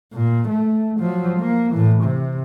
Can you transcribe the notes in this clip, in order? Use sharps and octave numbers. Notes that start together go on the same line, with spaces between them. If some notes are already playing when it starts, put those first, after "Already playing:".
A#2
A3
F3 F#3
A#3
A2 E3
C3